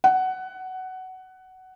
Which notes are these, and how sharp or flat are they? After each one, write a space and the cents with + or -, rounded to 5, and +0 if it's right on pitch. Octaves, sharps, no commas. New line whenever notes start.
F#5 +15